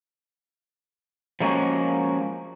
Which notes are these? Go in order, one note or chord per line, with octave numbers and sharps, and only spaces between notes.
F3 G#3 A#3 C#4 F#4